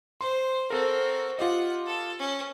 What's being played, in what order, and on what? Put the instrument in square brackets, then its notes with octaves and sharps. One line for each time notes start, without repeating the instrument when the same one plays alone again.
[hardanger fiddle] C5 [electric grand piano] C6
[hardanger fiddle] C4 F#4 [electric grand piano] A4 A#4
[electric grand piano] F4 G4 D#5 [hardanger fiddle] F#5
[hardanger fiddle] A4
C#4